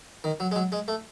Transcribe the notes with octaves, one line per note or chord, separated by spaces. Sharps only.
D#3
F#3
G#3
F#3
G#3
A3